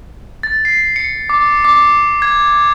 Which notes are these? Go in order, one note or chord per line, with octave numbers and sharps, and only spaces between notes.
A6
C7
C#7
D6
D6
G#6